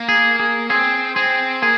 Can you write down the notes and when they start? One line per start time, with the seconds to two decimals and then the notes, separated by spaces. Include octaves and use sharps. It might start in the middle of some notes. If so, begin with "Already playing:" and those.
Already playing: A#3
0.09 G#4
0.39 G#4
0.70 C4 G#4
1.16 C4 G#4
1.62 A#3 G#4